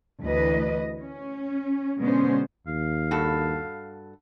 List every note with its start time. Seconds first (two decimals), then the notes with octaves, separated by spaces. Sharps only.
0.22 D2 E3 B4 D#5
1.00 C#4
1.97 B2 D3 G#3 B3 C#4 C5
2.67 D#2 F5
3.11 G2 F#4 A4